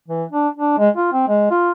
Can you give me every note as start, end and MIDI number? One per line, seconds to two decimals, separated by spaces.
0.08 0.24 52
0.32 0.48 62
0.57 0.76 62
0.78 0.89 56
0.96 1.07 65
1.12 1.24 60
1.28 1.49 56
1.51 1.71 65